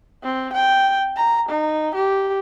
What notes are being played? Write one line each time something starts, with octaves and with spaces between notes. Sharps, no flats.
C4
G5
A#5
D#4
G4